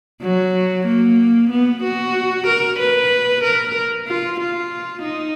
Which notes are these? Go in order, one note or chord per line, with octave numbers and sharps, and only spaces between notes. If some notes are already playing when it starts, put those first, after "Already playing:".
F#3
A#3
B3
F#4
A#4
B4
A#4
F4
F4
D#4